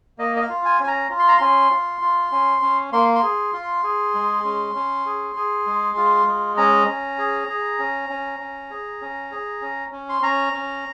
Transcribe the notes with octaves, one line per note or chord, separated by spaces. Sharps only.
A#3 D#5
D#5
F5
F4
G#5
C#4 G#5
A#5
F4
C6
A#5
C#4 C6
F4
F4
C#4
C#4
A#3 C6
C6
G#4
F4
G#4
G#3
C#4
C#4
G#4
G#4
G#3
F4
G#3
C#4 A#5
C#4
G#4
G#4
C#4
C#4
C#4
G#4
C#4
G#4
C#4
C#4
C6
C#4 A#5
C#4